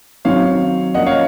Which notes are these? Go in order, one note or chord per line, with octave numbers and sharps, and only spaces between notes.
D#3 F#3 C4 D#4 C#5 F5
F3 A#3 C#4 D#5 F#5
C#5 F5